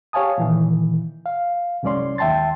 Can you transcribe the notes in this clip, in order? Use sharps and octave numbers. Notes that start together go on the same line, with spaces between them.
G4 C#5 F5 G#5 A5 D#6
A#2 D#3 E3
F5
C2 F#2 G#3 C#4 D5 C6
D#2 E5 G5 A5 C6 A6